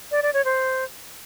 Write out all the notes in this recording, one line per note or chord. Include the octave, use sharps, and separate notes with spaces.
D5
D5
C#5
C5